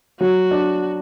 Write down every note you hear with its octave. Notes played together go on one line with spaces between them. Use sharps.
F#3 F#4
D4